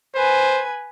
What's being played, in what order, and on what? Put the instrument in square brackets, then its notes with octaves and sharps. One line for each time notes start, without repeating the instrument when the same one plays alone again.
[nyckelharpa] B4 G#5 [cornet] C5